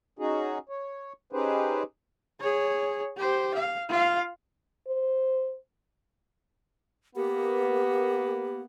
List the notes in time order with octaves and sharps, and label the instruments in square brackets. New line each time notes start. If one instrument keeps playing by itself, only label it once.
[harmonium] C#4 D#4 F#4 G#4
C#5
C#4 D#4 G4 G#4 B4 C5
[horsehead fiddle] G#4 C#5
G4 C5
F5
F4 F5
[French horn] C5
[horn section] A#3 B3 [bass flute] G4